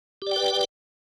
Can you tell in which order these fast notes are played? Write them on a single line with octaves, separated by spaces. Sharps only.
G4 D5 G5 B4